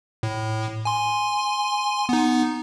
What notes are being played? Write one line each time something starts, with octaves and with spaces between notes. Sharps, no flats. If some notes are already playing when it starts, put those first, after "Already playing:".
A2
G#5 C6
B3 D#4